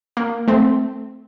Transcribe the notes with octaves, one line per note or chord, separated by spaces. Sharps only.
A#3
A3 C4